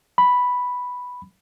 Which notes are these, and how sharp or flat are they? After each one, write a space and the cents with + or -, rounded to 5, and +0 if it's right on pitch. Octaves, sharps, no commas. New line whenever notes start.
B5 +0